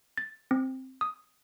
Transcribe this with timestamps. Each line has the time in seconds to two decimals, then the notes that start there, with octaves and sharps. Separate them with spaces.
0.17 A6
0.51 C4
1.01 D#6